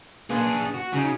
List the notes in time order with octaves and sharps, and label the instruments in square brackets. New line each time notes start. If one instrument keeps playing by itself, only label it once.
[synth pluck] A#3 B4 C6 [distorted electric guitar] D4 G#4
[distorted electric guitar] F#4
[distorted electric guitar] C#3 [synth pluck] D#4 F#4